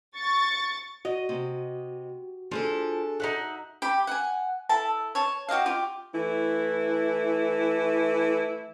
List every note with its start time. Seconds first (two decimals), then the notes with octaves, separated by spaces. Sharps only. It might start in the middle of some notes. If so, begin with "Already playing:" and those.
0.16 C#6 A6
1.05 F#4 D#5
1.29 C3
2.51 F3 D4 G#4 A4
3.20 D#4 E5 F#5
3.82 G4 B5
4.07 F#5 G#5
4.69 E4 A4 A5
5.15 C#5 A5
5.49 F#4 G4 D#5 F5
5.66 F4 G4
6.15 E3 A3 E4